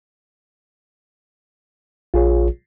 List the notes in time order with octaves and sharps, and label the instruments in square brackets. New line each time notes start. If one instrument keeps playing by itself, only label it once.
[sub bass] A#1 [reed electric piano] F4 G#4 C#5